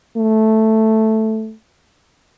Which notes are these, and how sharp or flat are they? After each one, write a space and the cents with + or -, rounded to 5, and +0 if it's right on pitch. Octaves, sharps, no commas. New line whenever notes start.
A3 +0